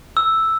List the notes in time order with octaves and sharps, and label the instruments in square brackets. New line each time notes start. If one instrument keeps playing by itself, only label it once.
[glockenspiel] E6